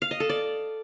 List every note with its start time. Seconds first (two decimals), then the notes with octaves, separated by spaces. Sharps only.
0.02 F5
0.11 D#5
0.20 A4
0.29 D5